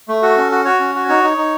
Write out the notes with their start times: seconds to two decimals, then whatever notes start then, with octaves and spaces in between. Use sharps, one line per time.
0.08 A3
0.22 F#4 A4
0.37 C#4
0.52 F#4
0.65 F#4 C#5
0.80 C#4
0.95 F#4
1.09 D#4 C#5
1.23 D#4
1.38 D#4